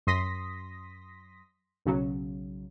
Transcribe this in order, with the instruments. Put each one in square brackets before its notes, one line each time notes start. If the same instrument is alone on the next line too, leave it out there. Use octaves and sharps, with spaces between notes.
[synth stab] F#2 C6 D#6 A#6 B6
B1 C#3 F#3